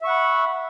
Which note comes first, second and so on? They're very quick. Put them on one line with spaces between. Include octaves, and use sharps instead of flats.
E5 C#6 F#5 B5